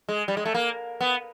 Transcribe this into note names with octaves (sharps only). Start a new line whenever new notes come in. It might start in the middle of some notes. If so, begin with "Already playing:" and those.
G#3
G3
G#3
A3
A#3
B3